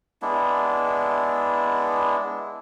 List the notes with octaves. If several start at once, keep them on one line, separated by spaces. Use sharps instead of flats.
G#3 B3 D4 E4